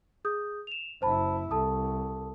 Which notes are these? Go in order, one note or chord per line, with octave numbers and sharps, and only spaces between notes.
G#4 D#6 G6
E7 F7
F#1 E4 C5 A5 B5
C2 A4 A5 D#6